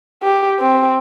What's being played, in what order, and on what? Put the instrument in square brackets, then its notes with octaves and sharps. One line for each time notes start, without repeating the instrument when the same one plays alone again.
[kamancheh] G4
C4